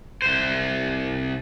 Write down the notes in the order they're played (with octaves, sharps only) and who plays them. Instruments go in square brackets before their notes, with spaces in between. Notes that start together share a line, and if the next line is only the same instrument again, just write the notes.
[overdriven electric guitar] C2 C5